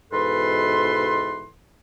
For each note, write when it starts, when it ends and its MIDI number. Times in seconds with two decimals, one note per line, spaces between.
0.12 1.48 44
0.12 1.48 47
0.12 1.48 52
0.12 1.48 69
0.12 1.48 71
0.12 1.48 84